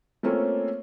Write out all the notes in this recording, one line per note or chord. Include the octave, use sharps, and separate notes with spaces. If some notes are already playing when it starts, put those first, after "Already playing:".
A3 A#3 C4 C#4 F4 A4